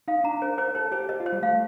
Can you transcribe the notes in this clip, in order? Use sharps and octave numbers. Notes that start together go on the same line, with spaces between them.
D#4 F5
D4 A#5
A#4 C5
A#4 C5
A4 C5
G4 C5
G4 D#5
F4
C5
G3
A3 F5